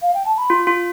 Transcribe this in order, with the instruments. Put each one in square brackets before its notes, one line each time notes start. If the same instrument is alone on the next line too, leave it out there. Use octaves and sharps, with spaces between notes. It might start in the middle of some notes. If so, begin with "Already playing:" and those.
[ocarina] F5
G5
A5
B5
[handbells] F4 [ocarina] C6
[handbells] F4